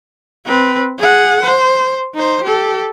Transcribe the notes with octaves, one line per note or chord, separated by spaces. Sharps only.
C4 B4
G#4 F#5
C5
D#4 C5
G4 A4